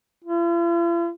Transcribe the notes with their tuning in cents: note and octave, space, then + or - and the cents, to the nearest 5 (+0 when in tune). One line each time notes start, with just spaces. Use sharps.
F4 -45